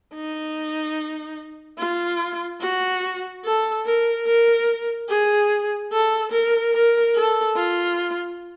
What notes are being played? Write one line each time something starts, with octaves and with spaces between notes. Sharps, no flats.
D#4
F4
F#4
A4
A#4
A#4
G#4
A4
A#4
A#4
A4
F4